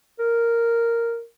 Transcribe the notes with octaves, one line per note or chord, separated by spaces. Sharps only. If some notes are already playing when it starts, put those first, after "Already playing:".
A#4